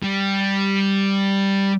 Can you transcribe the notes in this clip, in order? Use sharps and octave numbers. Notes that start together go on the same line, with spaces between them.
G3